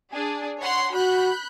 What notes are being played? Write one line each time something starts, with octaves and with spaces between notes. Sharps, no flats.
D4 G#4
C#5 F#5 C6
F#4 B5 F#6 G6